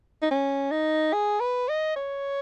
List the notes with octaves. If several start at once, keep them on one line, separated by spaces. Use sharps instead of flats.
D#4
C#4
D#4
G#4
B4
D#5
C#5